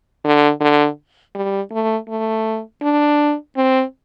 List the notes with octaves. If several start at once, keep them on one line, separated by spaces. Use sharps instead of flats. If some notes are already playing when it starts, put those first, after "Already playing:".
D3
D3
G3
A3
A3
D4
C4